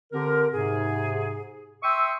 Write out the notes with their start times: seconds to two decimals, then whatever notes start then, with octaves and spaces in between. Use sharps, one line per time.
0.12 D3 C4 G4 A#4
0.52 G#2 C3 G#4
1.83 E5 G5 C6 C#6 D#6 E6